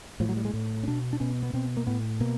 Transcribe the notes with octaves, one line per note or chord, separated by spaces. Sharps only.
A2 F3
F#3
G3
G#3
A2
C#4
B2 D4
D4
B2 C#4
B3
B2 C4
A#3
A2 B3
B2 A#3